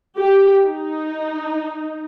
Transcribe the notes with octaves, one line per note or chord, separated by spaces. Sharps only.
G4
D#4